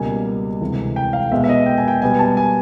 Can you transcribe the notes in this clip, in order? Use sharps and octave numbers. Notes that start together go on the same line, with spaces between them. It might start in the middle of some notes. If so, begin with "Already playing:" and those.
Already playing: C#2 B2 G3 A#3 G#5
D2 C3 E3 G#3
G5
F5
B2 G#3 B3 E5
E5
D#5
G5
G#5
G5
B2 G3 B3 G#5
A5
G#5